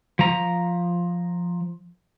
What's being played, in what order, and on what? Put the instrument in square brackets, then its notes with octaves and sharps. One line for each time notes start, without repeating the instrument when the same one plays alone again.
[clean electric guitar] F3 A#5